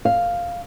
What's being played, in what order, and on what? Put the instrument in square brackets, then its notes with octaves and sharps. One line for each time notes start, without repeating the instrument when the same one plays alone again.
[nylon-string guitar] F5